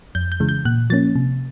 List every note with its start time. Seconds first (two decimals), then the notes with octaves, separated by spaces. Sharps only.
0.15 F2 G6
0.32 G6
0.40 C#3 E3 G#3
0.49 G6
0.65 A#2 F#6
0.90 F3 A#3 C#4 A6
1.16 C3